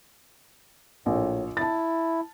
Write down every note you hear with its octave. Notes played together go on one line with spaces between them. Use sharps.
A#1 A2
E4 A5 A6